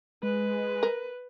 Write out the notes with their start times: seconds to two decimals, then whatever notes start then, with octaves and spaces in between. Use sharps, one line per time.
0.23 G#3 B4
0.83 A#4